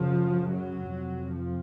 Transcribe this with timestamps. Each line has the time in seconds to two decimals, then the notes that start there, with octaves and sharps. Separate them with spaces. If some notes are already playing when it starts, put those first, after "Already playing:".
Already playing: F#2 C#3 F3
0.50 F#3
0.90 F2 C3
1.31 F3